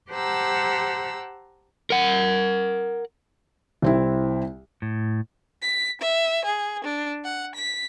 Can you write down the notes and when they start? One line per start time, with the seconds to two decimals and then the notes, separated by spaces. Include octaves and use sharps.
0.12 G4 C5 F#5 A5 A#5 E6
1.90 A#4 F#5
3.82 C2 C4 E4
4.82 A2
5.62 B6
6.01 E5
6.45 G#4
6.84 D4
7.24 F#5
7.55 B6